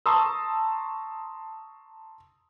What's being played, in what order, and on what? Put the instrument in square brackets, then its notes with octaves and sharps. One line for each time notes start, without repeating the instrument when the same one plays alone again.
[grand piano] A5 A#5 C6 C#6 D#6 E6